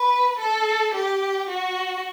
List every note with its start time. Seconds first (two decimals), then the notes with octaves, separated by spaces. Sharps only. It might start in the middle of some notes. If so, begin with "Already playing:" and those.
Already playing: B4
0.38 A4
0.94 G4
1.49 F#4